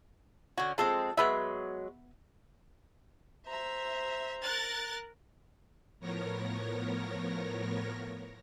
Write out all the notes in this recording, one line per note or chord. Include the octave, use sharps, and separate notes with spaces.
D3 C#4 F#4
F3 G#3 C4 A4
F#3 G#3 B3 B4 E5
C5 E5 A#5
A#4 F#6 A6
A2 F3 B3 A#4 C#5 A#6